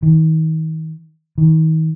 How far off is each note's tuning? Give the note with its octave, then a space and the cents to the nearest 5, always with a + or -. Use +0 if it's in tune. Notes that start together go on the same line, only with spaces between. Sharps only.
D#3 +40
D#3 +40